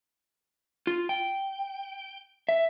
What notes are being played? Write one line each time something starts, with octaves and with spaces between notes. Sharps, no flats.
F4
G5
E5